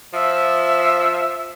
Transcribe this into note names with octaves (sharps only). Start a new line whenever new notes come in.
F3 E5